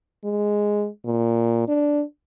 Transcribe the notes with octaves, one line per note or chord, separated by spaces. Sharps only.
G#3
A#2
D4